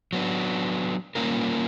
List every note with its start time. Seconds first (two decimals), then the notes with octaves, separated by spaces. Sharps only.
0.13 F#3 B3 D4
1.15 G3 A#3 C#4 F4 A#4